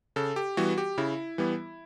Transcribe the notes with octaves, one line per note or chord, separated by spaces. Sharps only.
C#3 A4
G4
E3 G3 B3 F#4
G4
C#3 E4
E3 G3 B3